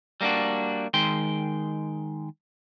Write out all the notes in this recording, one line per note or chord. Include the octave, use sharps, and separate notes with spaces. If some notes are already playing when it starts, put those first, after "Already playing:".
G3 A#3 C4 D4 F#4
D#3 G#3 G5 C6